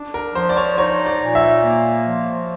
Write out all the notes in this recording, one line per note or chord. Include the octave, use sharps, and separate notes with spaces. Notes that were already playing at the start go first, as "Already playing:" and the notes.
Already playing: D4
A#4
F3 C5
D5
C#5
D#4 C#5
D5
A#2
E5
A#3
F3